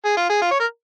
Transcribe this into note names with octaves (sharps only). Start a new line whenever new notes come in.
G#4
F4
G#4
F4
C#5
A#4